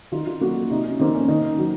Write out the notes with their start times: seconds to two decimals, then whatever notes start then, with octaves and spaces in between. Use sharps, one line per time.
0.12 D#3 F4
0.27 F4
0.41 F#3 A#3 F#4
0.70 C3 D#4
0.85 C#4
1.00 D#3 A#3 C4
1.15 C#4
1.28 D#3 D#4
1.58 F#3